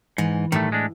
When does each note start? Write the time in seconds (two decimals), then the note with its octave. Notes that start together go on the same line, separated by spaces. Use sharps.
0.18 G#2 E3
0.52 A2 D#3 G3 A3
0.72 G#3 D4